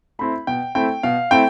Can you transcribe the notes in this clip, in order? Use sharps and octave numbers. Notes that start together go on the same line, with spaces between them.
A3 C4 E4 B5
B2 G5
A3 C4 E4 G5
B2 F5
A3 C4 E4 G5